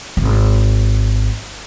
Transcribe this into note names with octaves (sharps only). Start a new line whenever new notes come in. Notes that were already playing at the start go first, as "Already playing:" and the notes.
D1 G#1